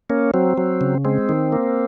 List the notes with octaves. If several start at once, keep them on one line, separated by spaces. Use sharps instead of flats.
A#3 C#4
F#3 C4
F#3
C#3
G#3 C4
D#3
A#3